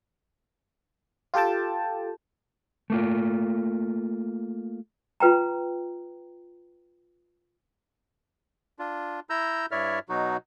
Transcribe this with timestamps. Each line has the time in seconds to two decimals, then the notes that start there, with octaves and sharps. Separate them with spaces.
1.34 F4 G4 A4 G5 A5
2.90 A3 A#3 F4
5.20 F4 B4 G5 A#5
8.79 D4 F4
9.30 E4 A#5 E6 G6
9.71 G2 E4 C#5 D5 E5 F6
10.09 B2 F#3 D#4 F#4